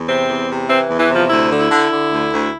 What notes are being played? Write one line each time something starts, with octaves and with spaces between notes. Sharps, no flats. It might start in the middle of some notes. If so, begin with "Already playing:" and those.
Already playing: E2
C3 C4
E2
C3
E3 C4
E2
E3
C3
F3
D2 E4
D3
E4
D3
D3
D2
D2